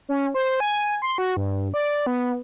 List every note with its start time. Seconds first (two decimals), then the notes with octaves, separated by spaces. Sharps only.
0.09 C#4
0.34 C5
0.60 G#5
1.02 C6
1.18 F#4
1.37 G2
1.74 D5
2.06 B3